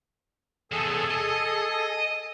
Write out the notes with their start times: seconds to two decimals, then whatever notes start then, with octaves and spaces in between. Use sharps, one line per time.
0.72 E2 C3 G#4 A4
1.11 D#5